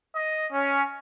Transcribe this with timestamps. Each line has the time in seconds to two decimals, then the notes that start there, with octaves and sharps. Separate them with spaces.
0.16 D#5
0.51 C#4